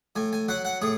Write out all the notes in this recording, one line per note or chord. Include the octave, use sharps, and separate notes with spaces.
A2 G#5
G#5
F#3 F#5
F#5
A2 G#4